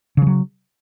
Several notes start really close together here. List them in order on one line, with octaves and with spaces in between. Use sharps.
C#3 F3 F#3